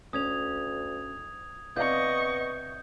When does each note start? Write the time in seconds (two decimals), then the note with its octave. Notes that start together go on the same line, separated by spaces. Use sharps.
0.13 D2 C#4 D#6 G#6 F7
1.76 C3 B3 D5 D#5 F5 C#6 G6